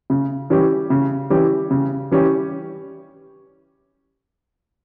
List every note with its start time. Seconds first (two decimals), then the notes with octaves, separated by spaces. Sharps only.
0.10 C#3
0.50 E3 G3 C#4 G4
0.90 C#3
1.30 E3 G3 C#4 G4
1.71 C#3
2.12 E3 G3 C#4 G4